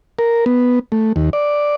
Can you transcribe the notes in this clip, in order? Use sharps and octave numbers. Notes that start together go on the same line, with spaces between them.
A#4
B3
A3
D#2
D5